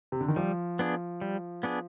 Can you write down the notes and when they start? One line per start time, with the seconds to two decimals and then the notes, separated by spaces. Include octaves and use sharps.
0.12 C3
0.21 D3
0.28 D#3
0.36 F3 G3
0.79 B3 D4 G#4
1.21 G3
1.63 B3 D4 G#4